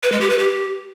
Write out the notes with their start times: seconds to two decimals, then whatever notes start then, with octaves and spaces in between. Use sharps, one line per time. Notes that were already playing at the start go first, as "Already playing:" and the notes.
0.03 B4
0.12 G#3
0.21 G4
0.30 B4
0.39 G4